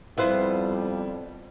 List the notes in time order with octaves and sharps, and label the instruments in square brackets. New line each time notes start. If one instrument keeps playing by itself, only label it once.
[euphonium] F2 [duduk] G3 [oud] B3 B4 C5 [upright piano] E4 F4